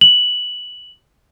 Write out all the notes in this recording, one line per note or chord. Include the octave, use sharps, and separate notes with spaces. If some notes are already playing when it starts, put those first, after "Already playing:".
F#7